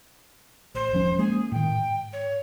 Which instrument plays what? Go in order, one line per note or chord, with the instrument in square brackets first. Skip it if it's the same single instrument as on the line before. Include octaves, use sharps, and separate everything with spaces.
[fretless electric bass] A1 [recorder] C5
[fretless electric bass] E1 F3 C#4
[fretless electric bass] G#3 A#3 C#4 [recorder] G#4
[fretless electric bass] A2 D#3 [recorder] G5
[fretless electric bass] G#2
[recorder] C#5